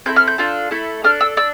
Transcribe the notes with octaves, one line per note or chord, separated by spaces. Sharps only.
C4 E4 A4 G6
F6
G6
D4 F4 A4
A3 E4 A4
D4 A4 F6
E6
D4 E6